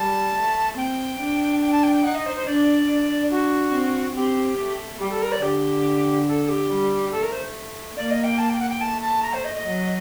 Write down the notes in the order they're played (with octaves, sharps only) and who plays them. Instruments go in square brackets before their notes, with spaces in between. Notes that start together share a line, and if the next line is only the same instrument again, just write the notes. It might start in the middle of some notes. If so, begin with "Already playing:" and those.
Already playing: [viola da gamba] G3 [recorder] A5
[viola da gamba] A3
[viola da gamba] C4 [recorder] G5
[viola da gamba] D4
[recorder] G5
A5
G5
G5
[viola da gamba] D#4 [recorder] F#5
[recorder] D#5
C5
C5
[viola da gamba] D4 [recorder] D5
[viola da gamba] D4
[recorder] F#4
[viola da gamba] C4
[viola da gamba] C4 [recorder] G4
[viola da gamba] A3
[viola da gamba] G3 [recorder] G4
[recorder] A4
A#4
D5
[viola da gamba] D3 [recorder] G4
[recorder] A4
G4
[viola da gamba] G3
[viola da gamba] A3 [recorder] A4
[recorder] A#4
C5
[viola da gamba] A#3 [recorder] D5
[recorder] D#5
G5
A5
G5
F#5
G5
[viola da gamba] A3 [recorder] A5
[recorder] A5
A#5
C5
D#5
D#5
[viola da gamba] F#3